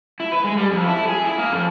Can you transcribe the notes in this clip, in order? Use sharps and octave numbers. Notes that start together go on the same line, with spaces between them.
E4
B4
G#3
G3
F2
E4
G#4
E4
A#3
F2